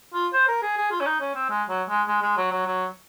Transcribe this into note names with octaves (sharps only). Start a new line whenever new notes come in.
F4
C5
A#4
G#4
G#4
F4
C#4
D#4
C#4
C4
G#3
F#3
G#3
G#3
G#3
F#3
F#3
F#3